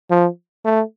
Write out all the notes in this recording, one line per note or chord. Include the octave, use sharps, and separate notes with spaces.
F3
A3